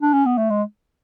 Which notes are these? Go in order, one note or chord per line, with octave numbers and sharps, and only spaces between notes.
D4
C#4
B3
A3
G#3